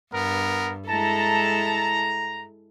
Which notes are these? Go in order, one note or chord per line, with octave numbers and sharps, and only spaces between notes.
G2 B3 A#4
G#3 E4 A4 A5 A#5